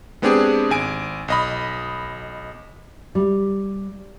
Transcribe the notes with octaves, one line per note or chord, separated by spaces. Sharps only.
G#3 B3 C4 D4 G4 G#4
G#1 G#5 D7
B1 D#5 B5
G3